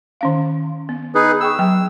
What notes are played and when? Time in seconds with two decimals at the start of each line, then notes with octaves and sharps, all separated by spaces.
0.21 D#3 C#4 F5
0.89 B3
1.15 D#4 G#4 B4
1.40 G#4 G5 C#6 E6
1.59 F#3 G5